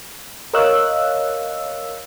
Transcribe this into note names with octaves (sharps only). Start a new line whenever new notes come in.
A#4 C#5 D#5 F5 E6 F#6